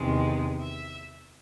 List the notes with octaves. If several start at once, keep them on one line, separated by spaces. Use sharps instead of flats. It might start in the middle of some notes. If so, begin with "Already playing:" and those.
Already playing: E2 C3 D#3 G#3
E5